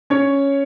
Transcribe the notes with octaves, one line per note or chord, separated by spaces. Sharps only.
C#4 C#5